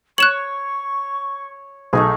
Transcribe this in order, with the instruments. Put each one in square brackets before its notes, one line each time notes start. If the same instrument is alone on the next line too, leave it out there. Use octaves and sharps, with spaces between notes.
[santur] C#5 [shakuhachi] C#6 [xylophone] F#6 E7 F#7
[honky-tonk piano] B1 [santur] A3 D#4 G#4